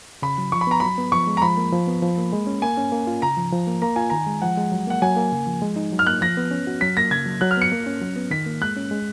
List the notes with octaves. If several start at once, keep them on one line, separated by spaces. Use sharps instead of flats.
C#3 B5
F#3
F3 C#6
B5
B3 A#5
F#3 B5
B3
F3 C#6
G#3
A#5
F3 B5
A#3
F3
B3
F3
A#3
G#3
C#4
A#3 G#5
C#4
A#3
F4
C#3 A#5
F3
F3
A#3
A#3 A#5
F4 G#5
D#3 A#5
G#3
F3 F#5
G#3
F#3
A#3 F#5
F#3 G#5
A#3
C#3
F3
G#3
D#4
F#3
F6
A#3 F#6
F3 A#6
B3
C#4
F#4
F#3 B6
A#3 A#6
C#3 G#6
F#3
F#3 F#6
F6
B3 C#7
A#3
C#4
F#3
B3
D#3 B6
A#3
G#3 F#6
C#4
G#3